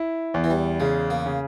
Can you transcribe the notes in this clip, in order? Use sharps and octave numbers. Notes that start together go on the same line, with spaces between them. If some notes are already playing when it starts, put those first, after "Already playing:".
Already playing: E4
E2
E3
G3
C#3 G#3
A#3
C#3